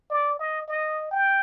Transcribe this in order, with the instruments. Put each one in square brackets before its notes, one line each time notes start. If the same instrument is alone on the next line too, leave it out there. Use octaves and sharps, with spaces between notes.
[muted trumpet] D5
D#5
D#5
G5